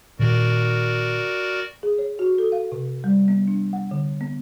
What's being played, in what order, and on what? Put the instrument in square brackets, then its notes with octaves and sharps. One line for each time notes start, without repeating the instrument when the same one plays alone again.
[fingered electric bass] A#2 D#3 [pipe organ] F#4 A#4 D5
[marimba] G#4
C#5
F#4
A4
F5
C3
G3
B3
D4
F#5
D3
B3